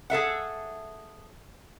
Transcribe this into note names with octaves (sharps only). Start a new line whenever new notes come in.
G#4 A4 E5 F#5